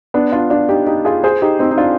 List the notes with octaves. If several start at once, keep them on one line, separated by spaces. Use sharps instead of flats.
B3 D4
D4 F4
D4 F4
D#4 G4
D#4 G4
F4 G#4
G#4 C5
D#4 G4
C4 D#4
D#4
D4 F4